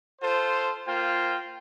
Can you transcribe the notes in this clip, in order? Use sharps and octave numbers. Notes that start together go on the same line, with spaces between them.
F4 A4 C5
A#3 F4 C5 G5